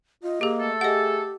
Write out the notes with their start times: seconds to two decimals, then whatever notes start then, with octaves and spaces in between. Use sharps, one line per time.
0.24 F4 D#5
0.41 A#3 G4 G#4
0.60 A3 A4
0.81 G4 G#4 D#5 F#5